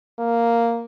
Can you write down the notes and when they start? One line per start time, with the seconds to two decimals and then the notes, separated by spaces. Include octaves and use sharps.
0.19 A#3